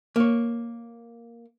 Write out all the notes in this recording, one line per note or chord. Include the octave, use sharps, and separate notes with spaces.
A#3 C#5